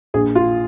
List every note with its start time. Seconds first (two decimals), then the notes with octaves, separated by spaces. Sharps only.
0.14 A#1 G#4
0.35 F4